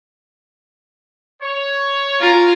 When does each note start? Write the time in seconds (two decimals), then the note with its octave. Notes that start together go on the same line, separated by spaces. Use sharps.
1.42 C#5
2.20 C#4 F4 A#4